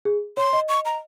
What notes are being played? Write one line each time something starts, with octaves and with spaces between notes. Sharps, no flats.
G#4
C#5 C6
D#5
C#6
A#5